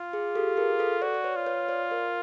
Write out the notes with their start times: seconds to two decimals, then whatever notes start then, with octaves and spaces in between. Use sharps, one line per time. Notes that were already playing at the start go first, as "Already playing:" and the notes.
Already playing: F4
0.13 G#4
0.35 G4 A4
0.57 G#4 A#4
0.79 A4 B4
1.02 F#4 C5 D5
1.15 D5
1.24 B4 C#5
1.36 F4
1.46 B4 C#5
1.69 C5 D5
1.91 A#4 C5